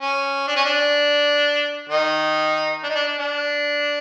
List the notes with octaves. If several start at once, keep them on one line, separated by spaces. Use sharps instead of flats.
C#4
D4
C#4
D4
D#3 D#4
D4
D#4
D4
D4
D4